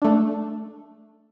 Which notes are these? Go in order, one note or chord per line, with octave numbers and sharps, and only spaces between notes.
A3 D4